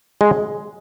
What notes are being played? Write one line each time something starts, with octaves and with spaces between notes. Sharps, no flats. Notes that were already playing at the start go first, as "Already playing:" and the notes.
G#3